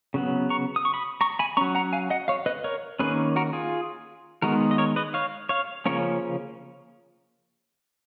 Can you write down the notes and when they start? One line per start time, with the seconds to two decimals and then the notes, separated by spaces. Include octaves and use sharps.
0.14 C#3 F#3 B3
0.50 A#5 C#6
0.76 D#6
0.85 C#6
0.94 B5 D#6
1.21 A#5 C#6
1.39 G#5 B5
1.57 F#3 C#4 A#5 C#6
1.75 F#5 A#5
1.93 F5 G#5
2.10 D#5 F#5
2.28 C#5 F5
2.46 B4 D#5
2.64 A#4 C#5
2.99 D#3 A#3 C#4 G#4 B4
3.36 F#4 A#4
3.53 F4 G#4
4.42 D#3 G#3 B3 D#4 F#4 A#4
4.71 D#5
4.78 A#4 C#5
4.96 B4 D#5
5.14 C#5 F5
5.49 C#5 F5
5.86 C#3 F3 A#3 C#4 A#4 C#5